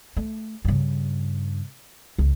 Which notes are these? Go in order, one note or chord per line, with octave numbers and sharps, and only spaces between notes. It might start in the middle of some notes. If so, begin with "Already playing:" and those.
A3
G2 C#3
C#2